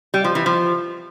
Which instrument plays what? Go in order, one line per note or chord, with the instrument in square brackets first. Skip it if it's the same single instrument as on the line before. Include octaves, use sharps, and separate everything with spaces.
[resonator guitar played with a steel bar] G3
F3
E3
F3